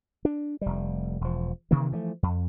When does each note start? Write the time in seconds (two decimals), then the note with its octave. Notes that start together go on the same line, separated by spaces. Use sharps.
0.25 D4
0.61 F1 G3
1.21 E1 F3
1.71 C3 D#3 E3 A#3
1.91 E3 F3 G#3 A3
2.23 F2